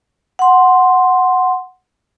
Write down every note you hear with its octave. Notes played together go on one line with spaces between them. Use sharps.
F#5 C6